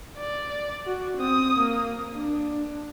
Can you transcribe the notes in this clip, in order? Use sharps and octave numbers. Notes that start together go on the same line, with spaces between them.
D5
F#4
C4 D#6
A#3
D4